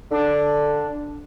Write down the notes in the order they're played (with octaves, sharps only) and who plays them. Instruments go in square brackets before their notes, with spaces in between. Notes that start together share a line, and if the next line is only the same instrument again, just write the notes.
[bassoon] D3 [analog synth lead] D4